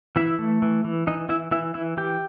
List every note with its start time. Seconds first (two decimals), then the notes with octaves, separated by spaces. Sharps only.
0.16 E3 E4 E5
0.39 A3
0.62 E3
0.85 E3
1.07 E3 D#4 D#5
1.29 E3 E4 E5
1.51 E3 E4 E5
1.74 E3 E4 E5
1.97 E3 G4 G5